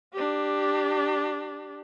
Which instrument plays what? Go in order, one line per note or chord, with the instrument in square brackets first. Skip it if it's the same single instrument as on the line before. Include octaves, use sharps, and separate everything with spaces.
[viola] D4 G4